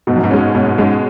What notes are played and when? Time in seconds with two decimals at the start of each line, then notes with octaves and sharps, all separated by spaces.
0.07 G#2 B2
0.16 F#2
0.24 G#2
0.31 G#3 C#4
0.39 G#2
0.55 G#2 B2
0.66 G#2
0.78 G#2 G#3 C#4